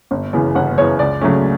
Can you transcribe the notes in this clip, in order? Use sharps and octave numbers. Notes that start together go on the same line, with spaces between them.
G1
F#2 C#3 E3 B3
G1 F#5
F#2 C#3 E3 B3 C#5
C#2 D5
C#3 F#3 A3 C#4